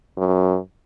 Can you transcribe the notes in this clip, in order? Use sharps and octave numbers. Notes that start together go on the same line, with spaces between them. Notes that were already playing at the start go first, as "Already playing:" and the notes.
F#2